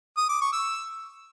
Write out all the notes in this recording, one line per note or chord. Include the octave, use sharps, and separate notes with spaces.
D#6
D6
C#6
E6